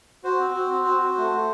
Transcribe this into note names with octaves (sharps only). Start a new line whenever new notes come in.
F#4 C5
C4
F#4
C4
F#4
F#4
A3
A3